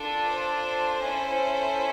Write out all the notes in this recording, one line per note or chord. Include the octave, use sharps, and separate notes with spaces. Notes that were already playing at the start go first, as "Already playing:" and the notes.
Already playing: D4 F4 A4
C5
C#4 E4 A4